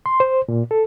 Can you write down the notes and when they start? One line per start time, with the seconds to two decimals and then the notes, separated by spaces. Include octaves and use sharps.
0.06 C6
0.20 C5
0.48 A#2
0.71 A4